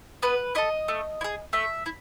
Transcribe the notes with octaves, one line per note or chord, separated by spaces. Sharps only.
B3 B4
E4 A4 D#5
A3
E4
G#4
A3 E5
E4